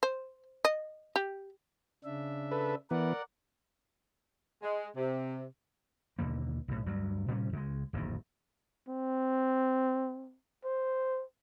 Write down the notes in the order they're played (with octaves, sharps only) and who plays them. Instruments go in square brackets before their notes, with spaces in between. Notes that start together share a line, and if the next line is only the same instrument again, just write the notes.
[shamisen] C5
D#5
G4
[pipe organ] C#3 D4 E5
[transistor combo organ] A4 B4
[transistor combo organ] E3 B3 [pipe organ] A#4 D5 F#5
[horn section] G#3
C3
[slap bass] D#2 B2 D3 A#3
B1 A2
D2 G2 F#3
A2 C3 G3 C#4
C#2 G#3
D1 A#1 F2 D#3
[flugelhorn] C4
C5